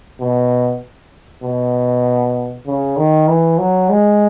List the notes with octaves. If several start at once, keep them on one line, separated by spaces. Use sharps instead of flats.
B2
B2
C#3
D#3
E3
F#3
G#3